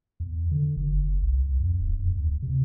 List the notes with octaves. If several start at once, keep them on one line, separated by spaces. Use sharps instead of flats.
E2
D3
F#1
F#1
C2
C2
F2
D1
F2
D2
C3